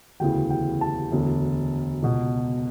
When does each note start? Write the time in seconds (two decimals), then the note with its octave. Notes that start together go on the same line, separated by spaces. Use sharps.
0.20 E1 D2 C#3 E3 G5
0.50 G5
0.81 A5
1.12 E1 D2 D3
2.02 C#2 B2